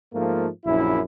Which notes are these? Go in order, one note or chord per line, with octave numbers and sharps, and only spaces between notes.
G#2 F3 A3 A#3
A#1 F#2 E4